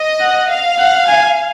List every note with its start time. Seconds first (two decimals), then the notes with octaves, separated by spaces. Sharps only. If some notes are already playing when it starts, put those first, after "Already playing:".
Already playing: D#5
0.20 F#5
0.50 F5
0.78 F#5
1.07 G#5